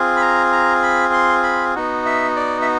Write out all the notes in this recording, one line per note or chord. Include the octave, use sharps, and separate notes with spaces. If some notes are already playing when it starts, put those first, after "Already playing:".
Already playing: C4 F4 G#4
B5
A#5
A#5
B5
C6
B5
B3 D#4 F#4
E5
D5
E5